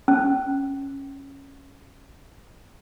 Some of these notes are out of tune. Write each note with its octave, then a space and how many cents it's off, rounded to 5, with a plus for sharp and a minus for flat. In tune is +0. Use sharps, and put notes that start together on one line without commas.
C#4 -10